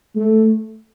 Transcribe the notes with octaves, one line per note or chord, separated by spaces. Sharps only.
A3